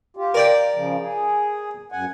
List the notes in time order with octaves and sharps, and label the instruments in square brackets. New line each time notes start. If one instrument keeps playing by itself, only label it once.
[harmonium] F4 G4
[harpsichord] A#4 D5 G5
[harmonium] C#3 F3
G#4
F#2 F#5 G#5